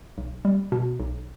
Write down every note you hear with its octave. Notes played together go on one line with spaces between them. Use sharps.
B1
G3
B2
B1